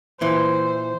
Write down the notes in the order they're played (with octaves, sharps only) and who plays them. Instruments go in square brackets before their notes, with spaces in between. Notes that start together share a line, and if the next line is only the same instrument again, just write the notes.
[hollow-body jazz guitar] A#2 E3 [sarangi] C5